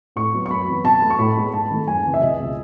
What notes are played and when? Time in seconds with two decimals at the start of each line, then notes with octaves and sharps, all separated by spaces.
0.16 A2 C#6
0.33 F#3 B3
0.46 C#6
0.50 F#2 B5
0.68 E3 B3
0.84 B2 A5
1.02 A3
1.10 C#6
1.19 A2 B5
1.36 G#3 B3
1.54 G#2 A5
1.70 D#3 A3
1.88 F#2 G#5
2.05 C#3 E3
2.14 E5
2.22 C#2 D#5
2.39 B2 G#3 B3